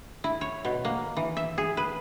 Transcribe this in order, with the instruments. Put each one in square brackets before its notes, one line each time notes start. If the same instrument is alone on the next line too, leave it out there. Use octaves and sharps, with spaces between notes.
[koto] E4
C#5
B2
A#3
E3
E5
G#4
B4